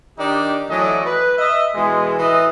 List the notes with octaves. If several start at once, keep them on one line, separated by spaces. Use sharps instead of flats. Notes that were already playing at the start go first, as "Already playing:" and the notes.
D#3 D4 D#4 G4
E3 F#3 A3 D5 D#5
B4
D#5 E5
B2 E3 G#3
A2 E3 D#5